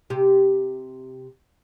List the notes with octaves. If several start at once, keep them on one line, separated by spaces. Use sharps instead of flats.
C3 G4